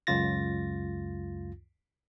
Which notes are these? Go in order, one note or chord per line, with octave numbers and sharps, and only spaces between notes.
C#2 F#2 F4 A6 A#6